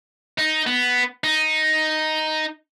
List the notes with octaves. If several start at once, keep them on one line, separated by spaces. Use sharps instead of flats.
D#4
B3
D#4